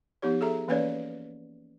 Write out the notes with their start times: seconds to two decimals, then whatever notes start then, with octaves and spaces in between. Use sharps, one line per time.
0.22 F3 B3 D#4 G4 C#5
0.41 G#4 A4 E5 A#5
0.68 E3 A#3 C#4 B4 C#5 D5